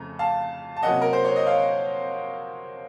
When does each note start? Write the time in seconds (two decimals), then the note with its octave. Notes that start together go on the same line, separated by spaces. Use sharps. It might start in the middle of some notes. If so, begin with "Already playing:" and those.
Already playing: F2 C#3 A3 A#5
0.19 F5 A5
0.77 A5
0.83 C3 F#3 A#3 C#4 D#5 F#5
1.02 A#4
1.13 C5
1.25 C#5
1.36 D#5
1.47 C#5 F5